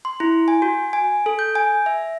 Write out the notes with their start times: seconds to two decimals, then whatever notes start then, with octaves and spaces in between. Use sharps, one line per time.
0.05 C6
0.20 E4
0.48 G#5
0.62 F#4
0.93 G#5
1.26 A4
1.39 G6
1.55 G#5
1.86 E5